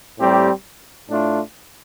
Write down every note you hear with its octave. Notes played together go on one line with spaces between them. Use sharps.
A2 G3 C4 G4
A2 A3 D4 F4